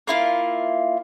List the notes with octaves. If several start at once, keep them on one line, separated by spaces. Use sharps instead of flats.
A#3 E4 F4